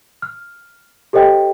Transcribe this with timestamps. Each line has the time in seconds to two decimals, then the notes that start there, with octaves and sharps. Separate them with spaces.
0.22 F6
1.13 G4 A4 C5 D#5 G5